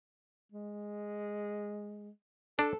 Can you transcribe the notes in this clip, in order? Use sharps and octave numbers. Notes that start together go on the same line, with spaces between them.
G#3
D4 A4